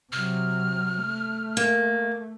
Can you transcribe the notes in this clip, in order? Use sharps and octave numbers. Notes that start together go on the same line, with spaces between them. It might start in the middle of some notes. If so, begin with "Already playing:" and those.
C3 F#3 F6
A3
A#3